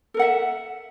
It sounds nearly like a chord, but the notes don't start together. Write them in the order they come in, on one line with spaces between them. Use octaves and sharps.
A4 A#4 F#5 E5